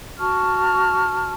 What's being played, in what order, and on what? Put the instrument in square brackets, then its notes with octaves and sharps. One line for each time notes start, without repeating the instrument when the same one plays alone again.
[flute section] F#4 A5 C#6 F6